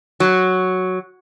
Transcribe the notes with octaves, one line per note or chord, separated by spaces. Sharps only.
F#3